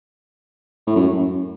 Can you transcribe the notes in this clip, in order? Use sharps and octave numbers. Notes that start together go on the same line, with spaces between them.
A2
F#2